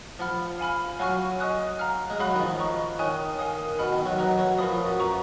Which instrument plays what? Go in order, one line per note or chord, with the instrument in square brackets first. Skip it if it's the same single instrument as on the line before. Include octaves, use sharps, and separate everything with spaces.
[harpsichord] F3 [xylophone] F#5 B5 F6
[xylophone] F5 G#5 B5 F6
[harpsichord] F#3 [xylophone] F5 G#5 C#6 F6
[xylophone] D#5 G#5 D#6 F#6
F5 A#5 F6
[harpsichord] G#3
[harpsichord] F#3 [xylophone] F5 B5 D#6 F#6
[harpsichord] D#3
F3
[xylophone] D#5 A#5 C#6
[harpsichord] D#3 [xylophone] C#5 G#5 D#6 F#6
[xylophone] A#4 F5 G#5 D#6
[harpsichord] B2 [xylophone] F#5 B5 F6
[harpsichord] D#3
F#3
[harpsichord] F#3 [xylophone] B4 D#5 A#5
[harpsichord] F#3
[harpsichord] F3 [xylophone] A#4 F5 B5 D#6
[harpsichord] F3
F#2
[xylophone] B4 F#5 A#5 C#6